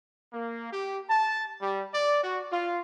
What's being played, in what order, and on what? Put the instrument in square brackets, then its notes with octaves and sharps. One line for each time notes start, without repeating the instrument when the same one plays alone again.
[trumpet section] A#3
G4
A5
G3
D5
F#4
F4